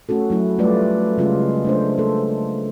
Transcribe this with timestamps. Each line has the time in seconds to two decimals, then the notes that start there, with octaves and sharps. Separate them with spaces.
0.09 A3 C#4 F#4 A4
0.30 F#3 A3 E4
0.59 G3 A3 F4 B4 D5
1.18 C#3 G3 G#3 C#4 F4
1.64 A3 D4 C5
1.98 A#3 A4